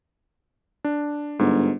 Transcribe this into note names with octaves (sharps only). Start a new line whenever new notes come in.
D4
G1 G#2